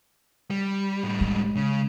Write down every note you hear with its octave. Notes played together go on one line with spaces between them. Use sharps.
G3
A2 G3
G#3
C#3